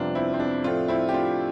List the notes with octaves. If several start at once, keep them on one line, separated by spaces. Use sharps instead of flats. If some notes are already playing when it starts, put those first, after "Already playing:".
Already playing: F2 C3 G3 B3 D4 F4
C4 E4
C4
D4
A2 F3 A3 C4 D4 F4
C4 E4
G4
D4 F4